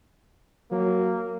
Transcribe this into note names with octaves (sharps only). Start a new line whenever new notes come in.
F#3 A#3